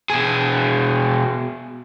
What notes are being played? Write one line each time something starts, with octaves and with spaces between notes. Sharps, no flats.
B2 G#4